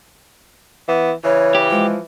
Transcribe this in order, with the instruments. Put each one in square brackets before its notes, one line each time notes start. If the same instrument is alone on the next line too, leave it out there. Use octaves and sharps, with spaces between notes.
[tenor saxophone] E3 [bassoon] B3
[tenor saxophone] C#3 [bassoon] E3 [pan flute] C#5
[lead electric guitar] G4
[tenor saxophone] F3 [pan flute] G#3